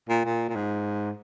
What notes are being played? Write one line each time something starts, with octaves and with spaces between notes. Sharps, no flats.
A#2
A#2
A#2
G#2